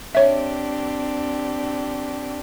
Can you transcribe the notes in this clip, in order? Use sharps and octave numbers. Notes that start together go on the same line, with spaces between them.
C4 D4 G4 C#5 E5